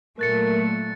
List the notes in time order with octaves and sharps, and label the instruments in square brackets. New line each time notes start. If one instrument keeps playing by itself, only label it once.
[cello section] A#2 F#3 A3 [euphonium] A#4 [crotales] F#6 A6 C#7